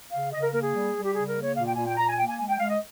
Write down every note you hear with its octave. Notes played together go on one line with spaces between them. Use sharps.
C#3 F5
C#3 D#5
A#4
A#3 A#4
G#4
G3
G3
G4
C#3 G#4
A#4
A#3
C#5
A#2 F5
G5
A#2 G#5
G5
A#2 A#5
G#5
A#3 G5
G#5
G#3 G#5
G5
G#3 F5
D#5